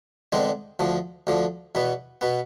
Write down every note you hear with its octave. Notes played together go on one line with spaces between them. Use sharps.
E2 D3 G#3 C4
D2 D3 F3
D2 D3 F3
E2 B2 B3
B2 B3